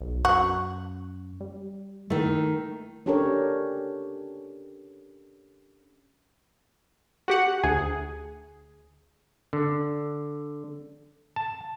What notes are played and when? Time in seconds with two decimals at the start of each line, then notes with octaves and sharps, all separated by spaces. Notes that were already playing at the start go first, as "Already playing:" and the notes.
0.01 B1
0.25 F#2 F#4
1.40 G3
2.10 D#3 A3 E4
3.06 C#4 D4 G4 A4 A#4 C#5
7.28 F#4 G4 F#5
7.63 D2 G#4
9.53 D3
11.36 A5